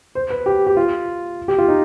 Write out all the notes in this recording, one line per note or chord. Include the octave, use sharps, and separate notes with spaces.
C5
B4
G4
G4
F4
G4
F4
D#4